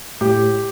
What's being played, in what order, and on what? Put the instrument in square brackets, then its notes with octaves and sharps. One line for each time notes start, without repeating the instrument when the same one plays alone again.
[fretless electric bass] A2 [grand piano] G4